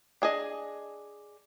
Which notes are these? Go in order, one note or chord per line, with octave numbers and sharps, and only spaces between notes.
D4 G#4 D#5